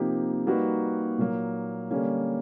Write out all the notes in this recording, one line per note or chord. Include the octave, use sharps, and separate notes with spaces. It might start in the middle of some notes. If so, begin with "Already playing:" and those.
Already playing: C3 F3 A#3 D#4 G4
G3 A#3 D#4 F#4 B4
A#2 F#3 A#3
D3 G3 A#3 C#4